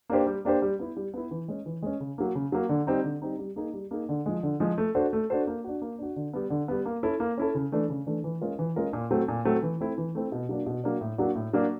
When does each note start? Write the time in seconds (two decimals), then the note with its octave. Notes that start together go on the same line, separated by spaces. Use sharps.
0.10 A#3 D4 G4 C5
0.27 G3
0.45 A#3 D4 G4 C5
0.62 G3
0.79 B3 E4
0.97 G3
1.14 B3 E4
1.31 E3
1.48 G#3 C#4
1.66 E3
1.83 G#3 C#4
2.00 C#3
2.18 F#3 A#3
2.35 C#3
2.52 F#3 A#3
2.69 D3
2.87 G3 C4 D#4
3.04 D3
3.22 G3 C4 D#4
3.39 G3
3.56 A#3 D#4 G#4
3.74 G3
3.91 A#3 D#4 G#4
4.09 D3
4.26 F3 G#3
4.43 D3
4.60 F3 G#3
4.78 A3
4.95 D4 F#4 A4 C5
5.13 A3
5.30 D4 F#4 A4 C5
5.47 A#3
5.64 D4 F#4
5.82 A#3
5.99 D4 F#4
6.16 D3
6.34 G3 B3
6.50 D3
6.68 G3 B3
6.85 A#3
7.03 C#4 E4 A4
7.20 A#3
7.38 C#4 E4 A4
7.55 C#3
7.72 E3 A3 D4
7.90 C#3
8.07 E3 A3 D4
8.24 E3
8.41 G#3 C#4 F4 A#4
8.59 E3
8.76 G#3 C#4 F4 A#4
8.93 A#2
9.11 F#3 A3 C4
9.28 A#2
9.45 F#3 A3 C4
9.63 E3
9.80 A3 C4 E4
9.98 E3
10.15 A3 C4 E4
10.32 B2
10.49 F#3 A#3 D4
10.66 B2
10.84 F#3 A#3 D4
11.01 A2
11.18 F#3 A#3 D4 F#4
11.36 A2
11.53 F#3 A#3 D4 F#4